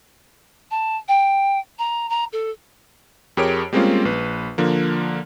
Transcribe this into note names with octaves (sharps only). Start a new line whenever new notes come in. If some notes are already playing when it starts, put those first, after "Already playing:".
A5
G5
A#5
A#5
A4
F2 G4 G#4 A#4 C#5 D7
G3 G#3 A#3 C4 C#4 F4
A#1 B4
D3 F3 A#3